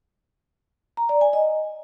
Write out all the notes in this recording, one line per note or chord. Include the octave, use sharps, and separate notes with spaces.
A#5
D5
G#5
D#5